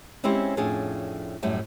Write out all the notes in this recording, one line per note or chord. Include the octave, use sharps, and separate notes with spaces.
G#3 C4 C#4 E4 G4 C5
F2 A2 C#4 D4 G#4
F#2 A2 G3 A3